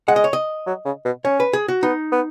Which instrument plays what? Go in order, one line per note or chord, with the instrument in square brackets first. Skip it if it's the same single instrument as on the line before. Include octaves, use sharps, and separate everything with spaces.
[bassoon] G#3 [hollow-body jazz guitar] F#5
[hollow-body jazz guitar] D#5
C#5
D#5
[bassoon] F#3
C#3
B2
[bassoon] C#4 [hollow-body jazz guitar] C#5
[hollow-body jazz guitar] B4
G#4
F#4
[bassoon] B3 [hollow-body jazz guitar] D#4
[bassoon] B3